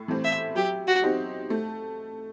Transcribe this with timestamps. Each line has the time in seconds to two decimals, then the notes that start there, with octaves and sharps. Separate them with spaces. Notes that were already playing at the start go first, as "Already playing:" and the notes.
Already playing: A2
0.08 E3 A3 C4
0.24 E5
0.55 F#3 G4
0.88 F#4
1.02 C4 D#4 G4
1.50 A3